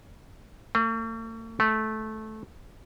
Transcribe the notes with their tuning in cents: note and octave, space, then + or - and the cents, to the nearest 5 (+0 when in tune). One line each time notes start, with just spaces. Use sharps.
A3 +45
A3 -15